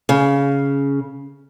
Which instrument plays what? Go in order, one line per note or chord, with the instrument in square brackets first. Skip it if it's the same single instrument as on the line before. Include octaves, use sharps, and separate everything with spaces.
[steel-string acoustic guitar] C#3